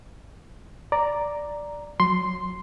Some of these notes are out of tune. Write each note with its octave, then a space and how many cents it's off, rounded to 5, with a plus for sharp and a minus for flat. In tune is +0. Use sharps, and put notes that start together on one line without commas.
D5 +0 A#5 +0
F#3 -25 C6 +0